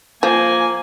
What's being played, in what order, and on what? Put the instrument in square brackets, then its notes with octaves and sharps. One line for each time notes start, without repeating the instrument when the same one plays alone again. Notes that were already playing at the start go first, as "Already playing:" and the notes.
[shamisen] F3 [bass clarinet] A#3 [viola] G#5